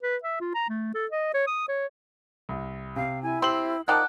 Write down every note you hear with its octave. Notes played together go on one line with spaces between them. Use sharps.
B4
E5
F4
A#5
A3
A4
D#5
C#5
D#6
C#5
C2
C3 F5
E4 G#5
C4 G4 C6 F#7
F3 D#4 A#4 D5 F#5 G5 A5 F#6